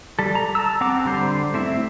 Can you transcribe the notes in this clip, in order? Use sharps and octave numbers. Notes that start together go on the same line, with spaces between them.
G3 A4
A#5
A5 A#5 E6
C4 F#5 A#5 D6
D3 G3 C5
A3 C4 E4